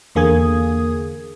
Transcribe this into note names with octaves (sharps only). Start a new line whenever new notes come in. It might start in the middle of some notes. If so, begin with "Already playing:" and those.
E2 D3 A#3 G#4 D#6 G#6